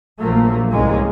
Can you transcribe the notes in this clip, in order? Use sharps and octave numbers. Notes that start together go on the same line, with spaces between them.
A#1 F3 F#3 A3 A#3
C2 G#2 G#3 A#3 C#4